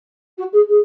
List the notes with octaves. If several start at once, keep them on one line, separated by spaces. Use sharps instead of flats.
F#4
G#4
G#4